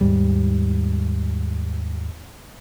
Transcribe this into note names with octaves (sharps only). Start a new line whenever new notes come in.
D#2 G#2 G3